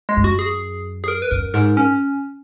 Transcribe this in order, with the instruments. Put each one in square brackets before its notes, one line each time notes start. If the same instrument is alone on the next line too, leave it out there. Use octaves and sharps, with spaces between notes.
[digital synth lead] G#3
[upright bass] F#2
[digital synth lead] F#4
G#4
G#4
A#4
B4
[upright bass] F#2 [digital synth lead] A#4
[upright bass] G#2 [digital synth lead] A#4
[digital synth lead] C#4